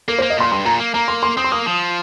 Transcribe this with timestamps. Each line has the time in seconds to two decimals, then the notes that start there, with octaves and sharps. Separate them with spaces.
0.08 A#3 A#4
0.18 C5
0.22 A#3
0.30 D#5
0.38 A#2 C6
0.52 G2 C6
0.65 A#2 A#5
0.79 A#3
0.94 A#3 A#5
1.08 C6
1.23 C6
1.37 C4 D#6
1.44 C6
1.52 A#3 D#6
1.66 F3